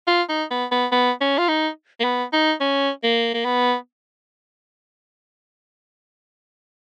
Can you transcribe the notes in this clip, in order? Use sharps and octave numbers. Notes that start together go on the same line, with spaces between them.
F4
D#4
B3
B3
B3
C#4
F4
D#4
A#3
B3
D#4
C#4
A#3
A#3
B3